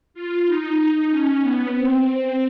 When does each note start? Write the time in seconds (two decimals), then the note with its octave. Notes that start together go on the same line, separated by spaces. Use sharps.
0.14 F4
0.46 D#4
1.11 C#4
1.42 B3
1.75 C4